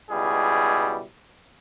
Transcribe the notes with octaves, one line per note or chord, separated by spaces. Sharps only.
C#2 B2 G3 E4 G#4